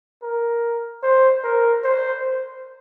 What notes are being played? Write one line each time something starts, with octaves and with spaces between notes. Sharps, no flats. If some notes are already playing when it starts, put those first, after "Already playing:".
A#4
C5
A#4
C5